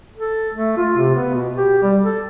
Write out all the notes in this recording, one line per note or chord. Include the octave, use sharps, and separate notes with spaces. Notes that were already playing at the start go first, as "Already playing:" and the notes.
A4
A3
F4
C3
B3
B2
G4
G3
A4